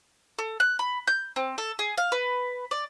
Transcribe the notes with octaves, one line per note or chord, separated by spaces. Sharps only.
A4
F#6
B5
G6
C4
A4
G#4
F5
B4
D5